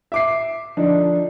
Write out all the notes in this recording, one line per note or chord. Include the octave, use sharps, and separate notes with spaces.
E5 D6 C7
D3 F3 D4 D#4